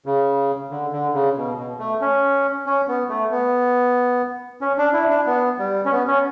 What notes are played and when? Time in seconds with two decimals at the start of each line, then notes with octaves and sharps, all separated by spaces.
0.06 C#3
0.71 D3
0.92 D3
1.14 C#3
1.37 B2
1.58 B2
1.79 A3
2.01 C#4
2.66 C#4
2.88 B3
3.09 A3
3.31 B3
4.61 C#4
4.78 D4
4.93 E4
5.10 D4
5.26 B3
5.59 G3
5.85 C#4
5.92 B3
6.07 C#4